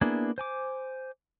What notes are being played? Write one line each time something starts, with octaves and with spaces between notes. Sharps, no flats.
A#3 B3 D4 E4 G#4
C5 G#5 D6